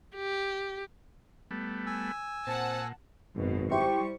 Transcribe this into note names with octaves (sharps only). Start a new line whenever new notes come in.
G4
G3 A3 B3
G#5 E6
A#2 C4 F#5 A5
G#1 F#2 B2
G3 E4 G4 C5 C#6